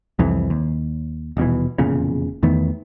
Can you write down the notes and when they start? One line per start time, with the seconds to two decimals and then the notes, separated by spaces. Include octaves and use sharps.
0.19 C2 F2 E3
0.50 D#2
1.37 D#1 B2 E3
1.78 F1 E2 A#2 C#3
2.43 E2 D#3 A3 B3